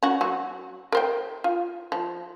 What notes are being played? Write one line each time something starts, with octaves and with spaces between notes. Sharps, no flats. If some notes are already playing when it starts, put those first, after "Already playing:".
C#4 F#4
F#3 F#4
A#4 C5 G5
F4
F3